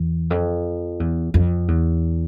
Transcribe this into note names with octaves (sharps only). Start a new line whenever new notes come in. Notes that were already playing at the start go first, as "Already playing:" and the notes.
Already playing: E2
F2
E2
F2
E2